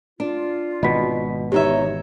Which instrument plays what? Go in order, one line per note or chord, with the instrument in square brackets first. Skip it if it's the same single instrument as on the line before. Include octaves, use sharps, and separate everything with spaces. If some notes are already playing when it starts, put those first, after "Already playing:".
[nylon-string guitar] D4 [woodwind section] F4
[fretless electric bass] G#1 B2 [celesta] D#5 B5 B6
[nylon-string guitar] E2 D#4 E5 [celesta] G4 [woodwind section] C#5